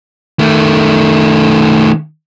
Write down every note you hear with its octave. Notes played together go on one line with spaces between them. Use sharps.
D#3 A3